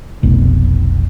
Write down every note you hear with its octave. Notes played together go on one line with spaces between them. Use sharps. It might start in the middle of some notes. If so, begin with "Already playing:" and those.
F1 B1